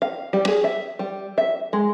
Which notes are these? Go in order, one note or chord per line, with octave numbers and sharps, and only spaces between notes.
F5
G3
G#4
E5
G3
E5
G#3